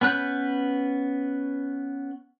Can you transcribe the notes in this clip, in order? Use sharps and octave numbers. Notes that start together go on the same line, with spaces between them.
B3 C#4 B4 F#6 G6